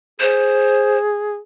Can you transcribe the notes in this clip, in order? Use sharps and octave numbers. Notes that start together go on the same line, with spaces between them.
G#4 C5